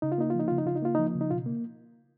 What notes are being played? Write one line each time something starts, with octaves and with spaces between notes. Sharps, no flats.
C#3 D#4
F4
A#3 D#4
F4
F3
D#4
C#3 F4
D#4
C#3 F4
D#4
A#3 F4
F3 D#4
C#3
D#4
B2 F4
A#3